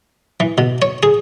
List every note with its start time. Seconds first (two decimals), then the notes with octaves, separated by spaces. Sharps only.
0.40 E3
0.58 B2
0.82 C#5
1.03 G#4